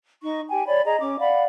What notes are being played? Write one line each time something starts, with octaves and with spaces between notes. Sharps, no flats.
D#4 C#6
G4 G5 G#5
C#5 D5 B5
G#4 D#5 A#5
C#4 D6
D5 F5 F#5 B5